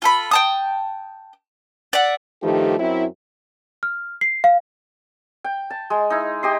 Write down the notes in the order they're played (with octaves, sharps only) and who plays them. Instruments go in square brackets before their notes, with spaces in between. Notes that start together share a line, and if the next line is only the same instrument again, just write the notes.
[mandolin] F4 A4 B5
G5 A5 D#6
D5 E5 F#5
[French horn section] G2 D#3 F3 A3 G4
F#2 F#3 C4 E4
[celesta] F6
C7
F5
[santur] G5
A5
G#3
D#4 E4
G4 D#5 C6